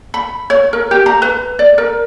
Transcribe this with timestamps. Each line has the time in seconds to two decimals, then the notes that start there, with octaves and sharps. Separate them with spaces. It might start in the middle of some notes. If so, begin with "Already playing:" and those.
0.14 B5
0.50 C#5
0.73 A#4
0.91 G4
1.06 A#5
1.22 B4
1.59 D5
1.78 A#4